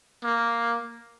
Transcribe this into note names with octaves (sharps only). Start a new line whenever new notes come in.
A#3